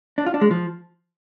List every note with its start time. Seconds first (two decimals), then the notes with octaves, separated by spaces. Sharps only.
0.18 D4
0.26 F4
0.34 D4
0.41 G#3
0.51 F3